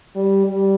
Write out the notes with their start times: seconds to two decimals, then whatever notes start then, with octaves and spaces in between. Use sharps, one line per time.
0.16 G3
0.46 G3